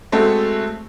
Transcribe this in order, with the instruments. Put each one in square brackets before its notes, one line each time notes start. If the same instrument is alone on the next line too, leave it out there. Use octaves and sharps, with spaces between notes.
[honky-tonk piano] G#3 A3 C4 F#4 A4